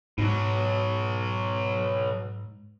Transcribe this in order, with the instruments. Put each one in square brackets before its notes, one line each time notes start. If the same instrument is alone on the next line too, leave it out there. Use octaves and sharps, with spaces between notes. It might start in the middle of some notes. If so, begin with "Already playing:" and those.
[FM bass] G#2 [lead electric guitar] B2 F#3